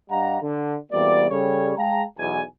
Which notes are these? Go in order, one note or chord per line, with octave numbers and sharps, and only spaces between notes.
G2 G3 D#5 F5 F#5 A#5
D3
E2 C3 G3 A#3 F#4 D5
C#3 G3 A4 C#5
G#3 G#4 F5 G5 A5 A#5
B1 E2 G#5